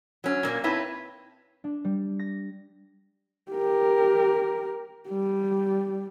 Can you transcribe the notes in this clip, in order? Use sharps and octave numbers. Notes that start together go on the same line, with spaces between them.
F#3 C#4
A#2 A#3 C#4
C4 D#4 E4 B4 C#5 A5
D4
G3
A#6
G4 A#4
G3